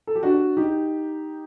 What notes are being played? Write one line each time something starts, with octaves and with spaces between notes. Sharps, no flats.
A4
G4
D4 F#4
D#4 G4